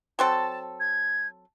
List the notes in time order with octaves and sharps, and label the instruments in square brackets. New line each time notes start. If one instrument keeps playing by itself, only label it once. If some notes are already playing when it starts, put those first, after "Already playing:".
[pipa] F#3 C4 A4 [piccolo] A5
[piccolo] G#6